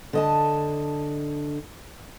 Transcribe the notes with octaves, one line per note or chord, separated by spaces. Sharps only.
D3 D#5 A5